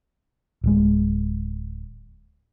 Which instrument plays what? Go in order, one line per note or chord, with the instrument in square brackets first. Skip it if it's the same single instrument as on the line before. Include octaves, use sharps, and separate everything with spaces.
[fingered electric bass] D1 G#3